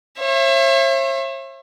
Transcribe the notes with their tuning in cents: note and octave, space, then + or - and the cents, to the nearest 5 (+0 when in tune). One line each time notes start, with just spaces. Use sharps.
C#5 -45 E5 +30